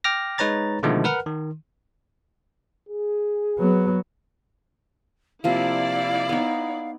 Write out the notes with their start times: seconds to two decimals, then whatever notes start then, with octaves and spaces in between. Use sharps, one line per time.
0.04 G5 D6 F6 A#6
0.38 G#3 D#4 B4 C#5 A#5 A6
0.83 B2 D3 D#3 F3 G#3 A3
1.04 A#4 B4 F#5 F6
1.26 D#3
2.89 G#4
3.58 F#3 B3
5.44 C3 F3 A#3 E4 D5 F5
6.29 B3 D#4